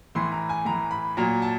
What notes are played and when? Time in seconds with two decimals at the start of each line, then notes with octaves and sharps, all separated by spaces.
0.15 A2 E3 C6
0.32 A#5
0.49 G#5
0.65 A2 E3 A#5
0.91 B5
1.17 A#2 F#3 A#5
1.42 A5